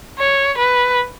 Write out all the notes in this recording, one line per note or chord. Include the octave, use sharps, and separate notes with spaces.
C#5
B4